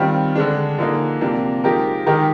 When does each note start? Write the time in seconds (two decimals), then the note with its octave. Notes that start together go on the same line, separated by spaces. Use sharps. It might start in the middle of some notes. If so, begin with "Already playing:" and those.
Already playing: D#3 G3 C4 F4
0.35 D3 G#3 D4
0.78 D3 F3 A#3 D#4 G#4
1.21 C3 F3 A#3 D4
1.64 F3 G#3 D#4 G4 A#4
2.06 D#3 G#3 D#4 G4 A#4